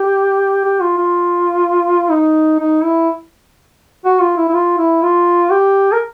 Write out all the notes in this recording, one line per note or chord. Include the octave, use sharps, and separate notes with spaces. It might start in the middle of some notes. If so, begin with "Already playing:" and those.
Already playing: G4
G4
F4
F4
D#4
D#4
E4
F#4
F4
E4
E4
F4
E4
F4
G4
A#4